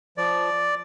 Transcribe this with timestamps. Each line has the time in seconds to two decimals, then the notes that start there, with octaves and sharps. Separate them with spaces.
0.17 F3 D5